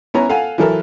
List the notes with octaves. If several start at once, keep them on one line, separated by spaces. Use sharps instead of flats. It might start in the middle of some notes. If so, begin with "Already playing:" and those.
B3 C#4 E4 C#5 A#5
A4 F5 F#5 G#5
E3 F#3 E4 A4 A#4